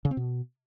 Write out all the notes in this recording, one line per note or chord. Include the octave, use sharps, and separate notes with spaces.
C#3
C4
B2